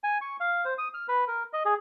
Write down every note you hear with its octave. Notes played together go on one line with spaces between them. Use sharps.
G#5
C#6
F5
C5
D#6
F6
B4
A#4
D#5
G#4